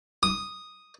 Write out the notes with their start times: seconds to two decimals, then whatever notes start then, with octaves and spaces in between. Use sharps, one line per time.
0.23 D#6